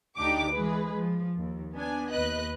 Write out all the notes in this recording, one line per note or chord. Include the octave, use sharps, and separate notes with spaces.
D2 D4 D#4 G4 D6
E3 G#3 G#4 B4
F3
D#2
B3 D4 G#5
D#2 B4 D#5 F#6